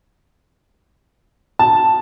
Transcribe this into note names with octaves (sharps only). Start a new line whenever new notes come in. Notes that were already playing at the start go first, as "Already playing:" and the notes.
A5